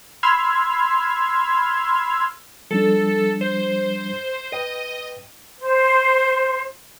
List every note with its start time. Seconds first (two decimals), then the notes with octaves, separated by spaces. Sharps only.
0.23 B5 C6 E6 F6 G#6
2.71 F3 G3 D4 A4
3.41 C5
4.52 B4 D#5 G5
5.59 C5